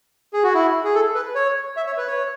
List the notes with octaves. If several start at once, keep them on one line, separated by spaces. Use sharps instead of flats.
G#4
F#4
E4
G#4
A4
B4
C#5
E5
C#5
B4
C#5